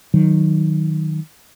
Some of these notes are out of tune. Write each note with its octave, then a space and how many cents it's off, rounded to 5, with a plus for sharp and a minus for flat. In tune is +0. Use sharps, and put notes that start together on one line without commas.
D#3 +0 F#3 +0